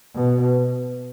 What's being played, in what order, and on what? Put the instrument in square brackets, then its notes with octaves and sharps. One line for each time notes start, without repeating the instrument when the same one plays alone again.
[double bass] B2